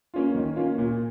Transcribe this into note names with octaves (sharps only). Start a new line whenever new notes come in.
A#3 C#4 F4
D#3
A#3 C#4 F4
A#2